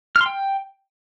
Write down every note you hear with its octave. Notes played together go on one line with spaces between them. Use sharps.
F6
C6
G5